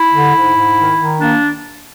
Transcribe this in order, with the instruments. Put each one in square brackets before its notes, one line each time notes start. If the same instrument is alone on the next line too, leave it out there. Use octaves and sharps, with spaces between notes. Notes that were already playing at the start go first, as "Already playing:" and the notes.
Already playing: [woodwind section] E4
D3
G#2
G#2
D#3
D#3
A#3 D4